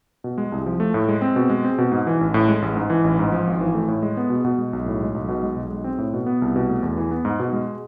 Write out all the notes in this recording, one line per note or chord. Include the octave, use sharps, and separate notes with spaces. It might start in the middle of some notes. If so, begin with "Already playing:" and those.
B2
G#3
C2
F3
A3
A2
G#3
C4
B2
G#3
C4
B2
G#2
E3
A1
A2
G#3
A1
G#2
E3
A1
G#2
F3
G#1
E3
A3
A2
G#3
B3
B2
B2
G#3
B1
A2
G#3
B1
B2
G#3
B1
G#3
C4
A2
B2
B3
C2
B2
A3
E2
E3
B3
G#2
B2
G#3